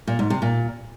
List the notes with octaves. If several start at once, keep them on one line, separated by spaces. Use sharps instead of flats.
A#2
G#2
C3
A#2